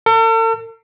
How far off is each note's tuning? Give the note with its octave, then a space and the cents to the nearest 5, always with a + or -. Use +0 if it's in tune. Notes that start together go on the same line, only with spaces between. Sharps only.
A4 +45